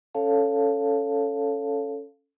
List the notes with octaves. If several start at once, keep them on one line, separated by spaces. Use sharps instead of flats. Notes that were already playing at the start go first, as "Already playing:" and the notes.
C#4 A4 C#5 F5 A5